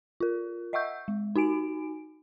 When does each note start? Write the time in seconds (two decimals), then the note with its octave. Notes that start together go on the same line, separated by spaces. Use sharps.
0.20 F4 A#4
0.73 D#5 E5 F#5 C#6 E6 G6
1.08 G#3
1.36 D#4 F#4 G#5 D7